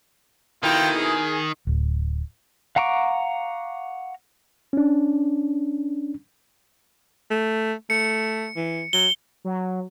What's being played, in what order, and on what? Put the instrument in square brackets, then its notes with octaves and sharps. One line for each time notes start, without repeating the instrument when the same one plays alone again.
[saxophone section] F2 B2 E4 [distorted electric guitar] D#3 [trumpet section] F4 G5
[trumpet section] G#4
[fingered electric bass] D1
[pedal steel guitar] F5 F#5 A#5 C#6 D6
[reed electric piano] C#4 D4
[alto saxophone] A3
[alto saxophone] A3 [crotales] C#7
[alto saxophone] E3
[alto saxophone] F#3 [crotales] G7
[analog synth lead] F#3